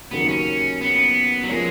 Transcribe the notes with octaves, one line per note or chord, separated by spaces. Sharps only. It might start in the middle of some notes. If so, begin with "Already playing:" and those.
D#2 C#3 F#3 A#3 B3
C#4
B3
F#3
F3 G#3 A#3 C#4